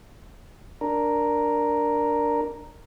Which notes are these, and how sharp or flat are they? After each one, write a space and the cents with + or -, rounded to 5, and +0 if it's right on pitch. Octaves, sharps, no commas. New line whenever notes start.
D4 +0 A#4 +0